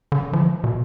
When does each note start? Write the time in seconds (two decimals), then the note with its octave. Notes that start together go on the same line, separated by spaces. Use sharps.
0.12 D3
0.33 F3
0.64 B2